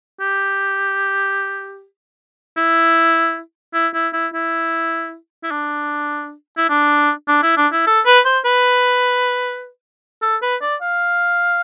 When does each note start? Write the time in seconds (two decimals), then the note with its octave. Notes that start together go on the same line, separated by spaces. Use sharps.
0.21 G4
2.57 E4
3.74 E4
3.94 E4
4.13 E4
4.34 E4
5.43 E4
5.51 D4
6.57 E4
6.69 D4
7.28 D4
7.42 E4
7.57 D4
7.72 E4
7.87 A4
8.06 B4
8.25 C5
8.45 B4
10.22 A4
10.42 B4
10.61 D5
10.81 F5